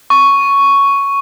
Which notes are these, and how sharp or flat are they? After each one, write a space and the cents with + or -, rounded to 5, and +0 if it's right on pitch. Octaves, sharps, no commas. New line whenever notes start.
C#6 +5